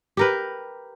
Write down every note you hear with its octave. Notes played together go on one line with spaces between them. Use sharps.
G4 A#4 B4